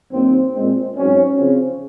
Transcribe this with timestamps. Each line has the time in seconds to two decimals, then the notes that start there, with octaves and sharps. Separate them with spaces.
0.11 F#2 D#3 A#3 C4
0.53 A#2 G#3 C4
0.95 G#2 F#3 C4 C#4
1.37 C#3 F3 C4